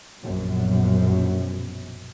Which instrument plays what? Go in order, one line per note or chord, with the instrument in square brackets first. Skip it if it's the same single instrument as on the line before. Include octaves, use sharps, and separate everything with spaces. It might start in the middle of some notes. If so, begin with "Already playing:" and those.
[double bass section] A#1 F#2 B2